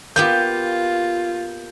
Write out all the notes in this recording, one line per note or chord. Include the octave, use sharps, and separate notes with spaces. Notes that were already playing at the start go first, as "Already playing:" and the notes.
A#3 B3 F4 G4 G6